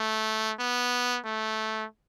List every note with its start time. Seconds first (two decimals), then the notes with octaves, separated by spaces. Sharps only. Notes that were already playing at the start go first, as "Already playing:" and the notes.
Already playing: A3
0.59 B3
1.26 A3